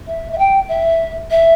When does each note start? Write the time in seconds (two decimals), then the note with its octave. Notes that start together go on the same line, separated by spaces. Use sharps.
0.07 E5
0.32 E5
0.38 G5
0.68 E5
1.31 E5